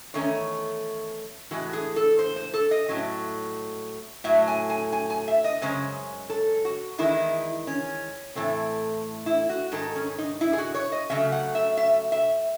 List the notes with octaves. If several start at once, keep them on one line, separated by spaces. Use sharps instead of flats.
E2 D#3 A3 C#4 C#5
A2 E3 G#3 F#4
G#4
A4
C5
C5
A4
D#5
A2 F#3 C#4
A2 F#3 A3 E5
G#5
G#5
G#5
G#5
E5
D#5
F#2 C#3 G#3 C#4 C5
A4
F#4
E2 D#3 G#3 E4
C#4
A2 E3 A3 C4
E4
F#4
G#2 D#3 G#3 A4
C#4
D#4
E4
G#4
F#4
C#5
D#5
C#3 F#3 A3 C#4 E5
F#5
E5
E5
E5